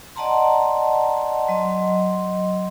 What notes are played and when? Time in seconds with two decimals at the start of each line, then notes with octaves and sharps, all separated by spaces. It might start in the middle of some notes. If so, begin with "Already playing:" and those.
0.16 D5 D#5 F#5 A5 A#5 C6
1.48 F#3 D#5 C6